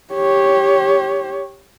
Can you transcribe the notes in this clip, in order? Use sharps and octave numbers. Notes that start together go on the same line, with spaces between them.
G4 C#5